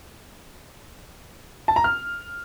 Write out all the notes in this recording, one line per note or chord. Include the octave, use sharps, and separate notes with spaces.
A5
A#5
F6